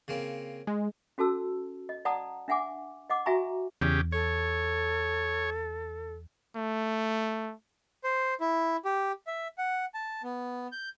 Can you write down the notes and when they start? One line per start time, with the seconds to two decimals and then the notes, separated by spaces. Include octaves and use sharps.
0.08 C#3 A#3 C4
0.67 G#3
1.18 C#4 F#4 A4 A5 E6
1.89 D#5
2.05 D5 F#5 A5 A#5 D#6
2.48 D4 E5 F#5 G#5 D6
3.10 D#5 F#5 D6
3.26 F#4 E5 G#5 A#5 C#6
3.81 E2 C#3 G4
4.12 A4 C#5
6.56 A3
8.04 C5
8.40 E4
8.85 G4
9.27 E5
9.58 F#5
9.94 A5
10.23 B3
10.72 G6